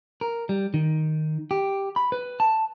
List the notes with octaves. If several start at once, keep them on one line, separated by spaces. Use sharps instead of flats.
A#4
G3
D#3
G4
B5
B4
A5